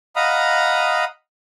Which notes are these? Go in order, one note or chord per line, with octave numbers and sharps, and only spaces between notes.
D#5 F5 F#5 A#5 B5 D#6